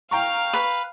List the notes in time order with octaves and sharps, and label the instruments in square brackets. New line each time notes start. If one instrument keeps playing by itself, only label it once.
[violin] F5 F6 [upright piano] G5 A#5 C#6
[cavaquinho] B4